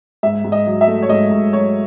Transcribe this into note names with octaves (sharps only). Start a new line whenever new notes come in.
G#2 E5
G#2
D#5
F#3
E5
A3
C#5
G#2 D#5
G#2
F#3 C#5